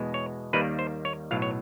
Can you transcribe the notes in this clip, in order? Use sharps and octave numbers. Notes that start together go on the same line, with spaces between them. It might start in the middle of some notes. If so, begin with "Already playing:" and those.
Already playing: E2 B2 G#3
C#5
D#2 D#3 G3 A#3 B4
C5
C#5
B1 A2 F#3 F5
C#5